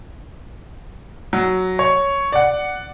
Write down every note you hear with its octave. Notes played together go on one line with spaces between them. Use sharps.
F#3
C#5
D5 F#5